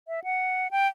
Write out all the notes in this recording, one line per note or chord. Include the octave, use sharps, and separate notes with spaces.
E5
F#5
G5